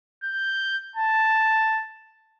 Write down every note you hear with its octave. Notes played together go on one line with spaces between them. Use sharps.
G6
A5